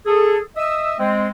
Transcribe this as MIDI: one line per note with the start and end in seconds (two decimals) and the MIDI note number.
0.06 0.38 68
0.06 0.38 69
0.56 0.94 75
0.56 0.94 76
0.56 0.94 87
0.56 0.94 88
0.99 1.27 56
0.99 1.27 60